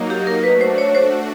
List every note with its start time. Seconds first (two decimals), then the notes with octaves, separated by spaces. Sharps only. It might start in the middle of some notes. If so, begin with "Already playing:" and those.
Already playing: F#3 A#3 D#4
0.10 G4
0.27 A#4
0.44 A3 D4 F#4 B4
0.61 C5
0.78 C#5
0.95 C5